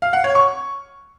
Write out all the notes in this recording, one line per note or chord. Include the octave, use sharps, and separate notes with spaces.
F5
F#5
C#5
C#6